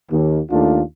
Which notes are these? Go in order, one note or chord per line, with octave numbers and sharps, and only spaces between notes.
D#2
D#2 A3 D4 F4